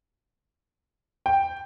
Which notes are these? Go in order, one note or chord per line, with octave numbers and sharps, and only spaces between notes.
G5